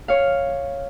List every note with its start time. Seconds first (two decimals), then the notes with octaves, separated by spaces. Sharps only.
0.08 C#5 F5